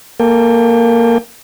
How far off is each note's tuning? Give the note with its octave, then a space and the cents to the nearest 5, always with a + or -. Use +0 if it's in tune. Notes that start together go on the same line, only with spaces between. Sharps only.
A#3 +0 A4 +0 G5 +35